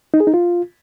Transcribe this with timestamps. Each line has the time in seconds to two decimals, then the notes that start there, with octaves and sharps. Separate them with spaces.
0.14 D#4
0.20 G#4
0.27 D#4
0.34 F4